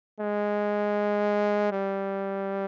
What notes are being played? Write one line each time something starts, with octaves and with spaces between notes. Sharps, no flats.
G#3
G3